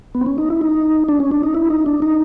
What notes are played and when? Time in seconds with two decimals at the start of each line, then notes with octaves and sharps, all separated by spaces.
0.15 B3
0.21 C4
0.26 C#4
0.38 D#4
0.50 E4
0.61 D#4
1.08 D4
1.20 C#4
1.31 D4
1.43 D#4
1.55 E4
1.70 D#4
1.86 D4
2.02 D#4